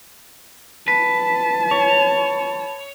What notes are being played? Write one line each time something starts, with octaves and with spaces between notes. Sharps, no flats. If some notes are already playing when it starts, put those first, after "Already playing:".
B4 A5
C#5